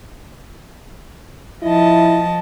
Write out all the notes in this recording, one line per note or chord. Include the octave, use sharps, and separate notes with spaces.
F3 E4 D#5 A5